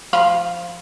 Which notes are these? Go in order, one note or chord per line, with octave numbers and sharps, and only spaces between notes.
F3 F5 B5